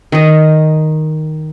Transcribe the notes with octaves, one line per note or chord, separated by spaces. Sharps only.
D#3 D#5